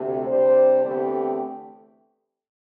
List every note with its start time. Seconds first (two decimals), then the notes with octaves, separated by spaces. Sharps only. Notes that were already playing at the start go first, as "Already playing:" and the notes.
Already playing: D2 C3 A3
0.27 C3 G3 D4 C5
0.84 E2 D3 A3 C4 G4